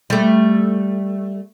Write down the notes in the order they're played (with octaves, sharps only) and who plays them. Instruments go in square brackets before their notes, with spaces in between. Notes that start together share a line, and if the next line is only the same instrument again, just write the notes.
[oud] G3 A3